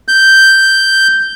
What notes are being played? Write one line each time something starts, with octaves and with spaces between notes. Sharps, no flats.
G6